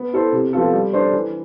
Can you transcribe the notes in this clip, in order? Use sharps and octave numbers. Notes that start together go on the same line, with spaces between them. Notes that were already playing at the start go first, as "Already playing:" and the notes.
Already playing: B3
E4 A4 C5
C3
F3 B3 F4 A4
G3
D4 A4 C5
E3